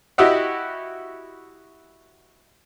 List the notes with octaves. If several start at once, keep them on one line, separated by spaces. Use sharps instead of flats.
E4 F#4 G4 D#5 E5 F#5